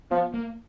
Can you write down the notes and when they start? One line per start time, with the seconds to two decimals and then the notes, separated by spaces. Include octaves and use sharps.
0.11 F3 B3
0.34 A#3